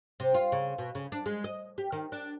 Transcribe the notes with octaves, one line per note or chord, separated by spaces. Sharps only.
C3
F4
C#3
B2
C#3
D4
G#3
D#5
G4
D#3
D4